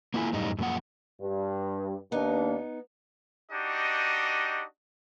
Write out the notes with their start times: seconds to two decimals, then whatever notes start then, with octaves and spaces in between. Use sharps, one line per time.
0.14 A#3 D4 E4 F4 G#5
0.33 F#2 A2 G3 D#4
0.58 F#2 A#2 F3 A#3 F#5
1.21 G2
2.12 D#2 A#3 B3 D4 D#4
3.52 D4 D#4 F#4 G4 D#5